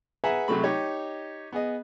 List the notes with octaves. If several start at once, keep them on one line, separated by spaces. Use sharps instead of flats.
G#4 B4 E5 F#5 G#5 A#5
C3 F#3 G#3 A3 B5
D#4 G4 C#5 D#5
B3 G#4 D#5